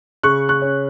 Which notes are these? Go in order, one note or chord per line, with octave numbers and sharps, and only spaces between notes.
C#3 C#6 F#6
C#6 F#6
C#4